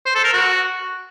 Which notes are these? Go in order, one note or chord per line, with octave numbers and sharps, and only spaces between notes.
C5
A4
A#4
F#4